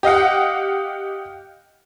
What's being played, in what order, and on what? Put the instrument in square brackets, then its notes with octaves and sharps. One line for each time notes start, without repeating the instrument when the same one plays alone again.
[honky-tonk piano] G4 D#5 F5 F#5